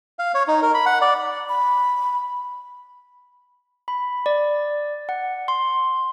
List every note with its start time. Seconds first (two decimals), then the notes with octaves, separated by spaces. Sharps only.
0.19 F5
0.34 C#5
0.48 D#4
0.62 A#4
0.74 B5
0.86 F#5
1.01 D5
1.49 B5
3.88 B5
4.26 D5
5.09 F#5
5.48 C6